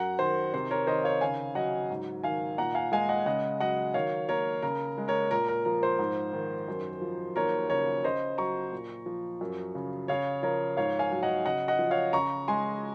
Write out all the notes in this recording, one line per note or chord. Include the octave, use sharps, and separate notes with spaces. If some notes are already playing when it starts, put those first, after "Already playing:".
Already playing: F#2 F#3 F#5 A#5
D#3 C5
C3 C5
A#4 C#5
D#3 C5 D#5
C#5 F5
C#3 F5 G#5
F#3 D#5 F#5
G#2
D#3 F5 G#5
A#2 F#5 A#5
F5 G#5
G#3 F5 G#5
D#5 F#5
C#3 D#5 F#5
F#3 D#5 F#5
D#3 C#5 F5
A#3 A#4 C#5
C#3 A#4
G#3
A#4 C#5
A#2 A#4
A#4
F3 A#4
C5
G#2
D#3
F#2
F3
D#2 A#4 C#5
C#3 A#4 C#5
C#3 C5 D#5
F#3 A#5 C#6
A#2
F3
F#2
C#3
C#3 C#5 F5
F3 A#4 C#5
G#2 C#5 F5
F5 G#5
F#3
D#5 F#5
C#3 D#5 F#5
D#5 F#5
F3
C#5 F5
C#3 A#5 C#6
G#3 G#5 C6